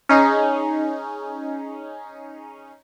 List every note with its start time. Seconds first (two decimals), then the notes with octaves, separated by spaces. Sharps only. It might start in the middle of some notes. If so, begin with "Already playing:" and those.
0.09 C#4 D#4 G#4